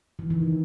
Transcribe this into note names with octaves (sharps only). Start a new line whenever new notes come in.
E3
D#3